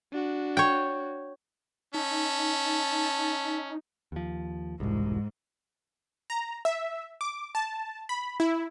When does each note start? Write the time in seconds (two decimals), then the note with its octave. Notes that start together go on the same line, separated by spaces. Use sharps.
0.12 D4 F#4
0.57 C#5 G5
1.94 C#4 D#4 E5 A5
4.12 D#2 F3
4.80 E1 C2 G#2
6.30 A#5
6.65 E5
7.21 D6
7.55 A5
8.09 B5
8.40 E4